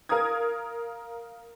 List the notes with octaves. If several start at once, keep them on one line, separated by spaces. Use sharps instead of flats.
A#4 F5 A#5 D#6 G#6